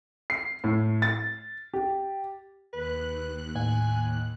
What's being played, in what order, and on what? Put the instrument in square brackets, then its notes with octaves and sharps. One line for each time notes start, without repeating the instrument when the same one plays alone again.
[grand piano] C7
A2
A6
G4
[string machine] D#2 F#6 [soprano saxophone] B4
[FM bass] A2 [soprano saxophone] G#5